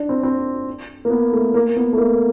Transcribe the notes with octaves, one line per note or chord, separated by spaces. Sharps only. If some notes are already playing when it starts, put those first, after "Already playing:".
Already playing: D4
C4
C4
A#3
B3
A3
A#3
B3
A3
A#3